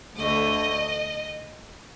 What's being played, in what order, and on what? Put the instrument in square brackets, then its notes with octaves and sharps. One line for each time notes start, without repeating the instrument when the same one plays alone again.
[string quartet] D2 D3 A3 [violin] D#5